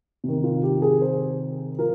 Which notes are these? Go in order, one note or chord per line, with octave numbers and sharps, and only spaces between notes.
C3 D#3
F4
G4
G#4
C5
F3 A#4